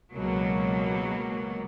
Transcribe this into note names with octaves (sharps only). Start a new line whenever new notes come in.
C#2 B2 F#3 A#3